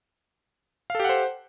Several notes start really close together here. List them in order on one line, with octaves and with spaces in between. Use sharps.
F5 A4 G4 F#5 C5